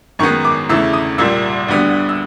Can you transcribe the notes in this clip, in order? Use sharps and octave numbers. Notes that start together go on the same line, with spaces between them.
F#2 D#3 G#3 B3 C#6
D6
E2 C#3 E3 A3 E6
D#6
C2 A#2 G3 E6
D2 D3 G3 B3
E6